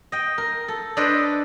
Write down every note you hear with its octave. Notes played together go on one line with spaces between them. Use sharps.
D#5 G5
A#4
A4
D4 A4 B4 C5 D5 D#5